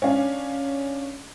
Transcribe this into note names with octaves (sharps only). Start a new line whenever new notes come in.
C#4 D4 F5